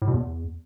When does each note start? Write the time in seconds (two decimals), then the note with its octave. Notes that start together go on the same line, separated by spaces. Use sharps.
0.02 A2
0.08 B2
0.14 E2